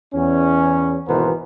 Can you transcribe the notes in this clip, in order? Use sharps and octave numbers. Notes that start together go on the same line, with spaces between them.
E2 C#4
G#1 B2 E3 B3 A#4 C5